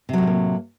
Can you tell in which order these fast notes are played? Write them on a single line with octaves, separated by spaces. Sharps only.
C3 F#3 A2 G3 A#3